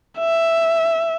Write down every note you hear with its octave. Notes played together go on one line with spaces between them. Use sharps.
E5